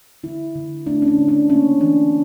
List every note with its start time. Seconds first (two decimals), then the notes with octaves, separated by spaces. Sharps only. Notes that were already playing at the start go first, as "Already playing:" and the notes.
0.23 D3 E4
0.55 D3
0.86 A3 D4
1.02 C#4
1.08 D4
1.18 D3
1.28 D4
1.50 A#3 C#4
1.81 E3 D4